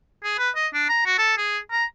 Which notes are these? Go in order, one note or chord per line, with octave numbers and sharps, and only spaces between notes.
G#4
B4
D#5
D4
A#5
F#4
A4
G#4
A#5